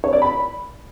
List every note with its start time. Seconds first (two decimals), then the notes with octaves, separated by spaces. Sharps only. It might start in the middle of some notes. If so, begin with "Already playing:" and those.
0.04 C#5
0.13 D5
0.22 B5